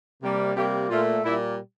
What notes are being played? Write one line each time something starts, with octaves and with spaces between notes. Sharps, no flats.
C3 G3 A#3
C3 G3 A#3 G4
A#2 A3 F4
A#2 G3 A#3 E4